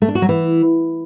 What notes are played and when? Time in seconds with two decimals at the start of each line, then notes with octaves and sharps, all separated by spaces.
0.02 A3
0.08 D4
0.15 F#4
0.22 F#3
0.29 E3